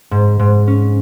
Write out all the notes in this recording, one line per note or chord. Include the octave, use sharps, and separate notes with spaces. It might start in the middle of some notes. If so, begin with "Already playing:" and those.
G#2
G#2
C#4